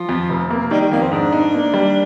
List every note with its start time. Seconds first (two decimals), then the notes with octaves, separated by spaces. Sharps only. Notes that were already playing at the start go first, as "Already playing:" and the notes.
Already playing: F3
0.09 F2
0.30 F1
0.50 A#3
0.71 D#3 G3
0.82 G3
0.91 F2 A#3
1.02 C4
1.12 G#2 D4
1.32 D#4
1.54 A#3
1.74 G3